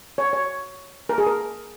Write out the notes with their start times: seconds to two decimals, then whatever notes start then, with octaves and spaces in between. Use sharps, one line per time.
0.18 C#5
0.33 C#5
1.09 A#4
1.18 G#4
1.27 A#4